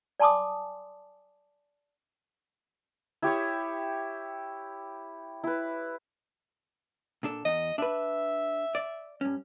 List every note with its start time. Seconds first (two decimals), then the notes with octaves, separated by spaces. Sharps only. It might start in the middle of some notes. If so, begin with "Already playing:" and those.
0.20 D5 G#5 A5 C6 D6 D#6
3.22 E4 G4 C#5 D#6
5.44 E4 B4
7.23 A#2 D4 A4
7.45 E2 D#5
7.78 D4 B4 E5
8.75 D5
9.21 G2 C#4